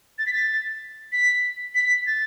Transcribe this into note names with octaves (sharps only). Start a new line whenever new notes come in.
A6
B6
A6
B6
B6
A6